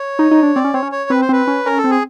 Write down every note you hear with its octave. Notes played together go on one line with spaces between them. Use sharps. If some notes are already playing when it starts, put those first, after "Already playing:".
Already playing: C#5
D#4
D#4
D4
C4 D5
C#4
C4 C#5
C#4
C#5
C4 B4
C5
C4 B4
C#4
C#4 A#4
A4
C4
G#4